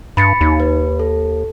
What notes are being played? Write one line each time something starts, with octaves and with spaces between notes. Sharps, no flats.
G2 B5 A6 C#7
D#2 D#4
B4
A4